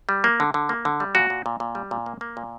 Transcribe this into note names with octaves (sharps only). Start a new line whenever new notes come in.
G3
A#3
D3
D3
A#3
D3
G3
A#2 F#4
A#2
A#2
A#2
G3
A#2
A#3
A#3
A#2